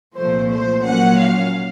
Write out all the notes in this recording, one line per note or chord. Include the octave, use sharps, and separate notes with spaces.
C2 A#2 F3 A3 C5
C5
A#2 F#3 A#3 C#4 F#5
F5